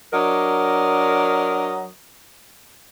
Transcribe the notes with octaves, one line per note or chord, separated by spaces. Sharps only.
F#3 D4 A#4 D#5